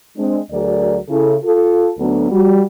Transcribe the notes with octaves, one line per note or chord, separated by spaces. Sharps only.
G#3 C4 D4
D2 F#3 G#4 A#4 D5
C#3 E4 A4
F4 A4
D2 F#3 B3 D4 A4
G3 F#4